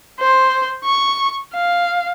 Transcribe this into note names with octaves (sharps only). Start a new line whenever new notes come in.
C5
C#6
F5